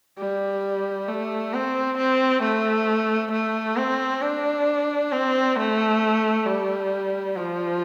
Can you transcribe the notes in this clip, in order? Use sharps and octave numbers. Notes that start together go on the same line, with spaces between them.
G3
A3
C4
C4
A3
A3
C4
D4
C4
A3
G3
F3